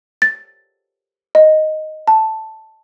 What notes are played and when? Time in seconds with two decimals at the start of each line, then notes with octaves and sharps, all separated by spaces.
0.22 A6
1.35 D#5
2.07 A5